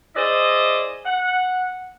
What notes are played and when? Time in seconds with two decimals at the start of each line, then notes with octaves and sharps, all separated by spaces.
0.16 E4 G#4 C5 D5 D#5
1.05 F#5